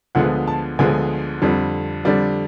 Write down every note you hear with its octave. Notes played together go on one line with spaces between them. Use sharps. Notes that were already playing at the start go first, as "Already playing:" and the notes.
D2 D3 F3 G#3 B3 F#5
A5
D2 D3 F3 G#3 B3 G#5
F2 D3 G3
F2 D3 G3 D5